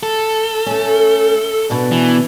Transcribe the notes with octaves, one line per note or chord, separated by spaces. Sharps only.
A4
A3 C#4
B2 B3 D4
E3